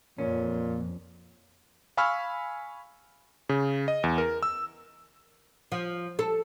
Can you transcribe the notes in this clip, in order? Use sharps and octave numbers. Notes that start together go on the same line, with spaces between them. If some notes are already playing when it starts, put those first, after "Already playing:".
F2 A#2 C#4
F5 G#5 B5 C#6 E6 F6
C#3
D#5
E2
A#4
E6
F3
A4